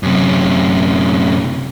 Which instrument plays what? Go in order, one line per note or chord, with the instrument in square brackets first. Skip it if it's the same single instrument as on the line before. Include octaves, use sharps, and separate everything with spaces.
[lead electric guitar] F#2 C3